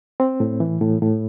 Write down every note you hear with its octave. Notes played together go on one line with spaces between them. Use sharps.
C4
A2
E3
A2
A2